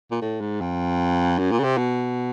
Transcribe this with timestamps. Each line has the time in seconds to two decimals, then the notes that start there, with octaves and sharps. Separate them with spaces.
0.11 A#2
0.22 A2
0.41 G#2
0.61 F2
1.39 F#2
1.51 A#2
1.59 C#3
1.64 C3
1.78 B2